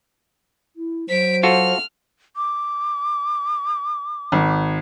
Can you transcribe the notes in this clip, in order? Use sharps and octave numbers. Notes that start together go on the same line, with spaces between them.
E4
F#3 C5 B6 D7
F4 F#4 A4 F6
D6
G#1